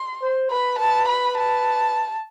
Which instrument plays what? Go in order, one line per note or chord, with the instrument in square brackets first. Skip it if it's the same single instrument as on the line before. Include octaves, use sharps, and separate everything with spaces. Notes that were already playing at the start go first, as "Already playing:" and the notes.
Already playing: [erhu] C6
[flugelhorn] C5
[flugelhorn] B4 [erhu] B5
[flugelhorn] B4 [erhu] A5
[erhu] B5
A5